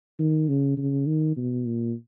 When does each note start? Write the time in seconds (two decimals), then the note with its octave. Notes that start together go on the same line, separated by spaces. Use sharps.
0.19 D#3
0.49 C#3
0.77 C#3
1.07 D#3
1.37 B2
1.67 A#2